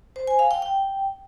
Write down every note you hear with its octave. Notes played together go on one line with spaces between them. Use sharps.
C5
G#5
F5
G5
G5